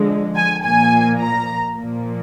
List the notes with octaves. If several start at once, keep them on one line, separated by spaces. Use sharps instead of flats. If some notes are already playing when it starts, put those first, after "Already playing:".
Already playing: D3 F3 G#3
G#5
A#2 F3 A#3 G#5
A#5
A#2 F3 A#3